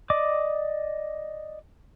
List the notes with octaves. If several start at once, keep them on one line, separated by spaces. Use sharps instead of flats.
D5 D#5 D6